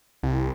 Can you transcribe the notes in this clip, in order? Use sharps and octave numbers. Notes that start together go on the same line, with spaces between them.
C2